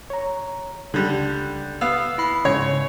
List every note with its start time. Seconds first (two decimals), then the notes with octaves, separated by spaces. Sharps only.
0.10 C#5 A#5
0.94 C#2 D3 G3 F#6
1.81 B3 F5 E6
2.18 E4 B5 C7
2.45 G#2 C#3 C#4 C#5